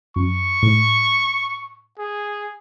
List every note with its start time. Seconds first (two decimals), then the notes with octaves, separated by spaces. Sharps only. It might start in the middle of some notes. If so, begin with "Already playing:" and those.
0.16 F#2 C#6
0.62 A2
1.99 G#4